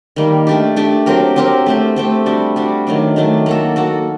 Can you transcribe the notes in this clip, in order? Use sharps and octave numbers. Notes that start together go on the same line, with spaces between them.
D#3 G3 A#3
A3 D4 G4
A3 D4 G4
F#3 C4 G4 A#4
F#3 C4 G4 A#4
A3 C4 G4
A3 C4 G4
G3 D4 F#4
G3 D4 F#4
D#3 F#3 A3 D4
D#3 F#3 A3 D4
A#3 F#4 A4
A#3 F#4 A4